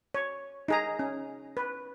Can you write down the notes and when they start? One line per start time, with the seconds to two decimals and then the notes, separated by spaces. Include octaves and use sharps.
0.14 C#5
0.68 D#4 G#4 A#5
0.99 C#4
1.57 B4